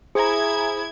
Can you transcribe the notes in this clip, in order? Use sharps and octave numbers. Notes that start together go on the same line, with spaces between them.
E4 G#4 C5 G#5 A#5 G#6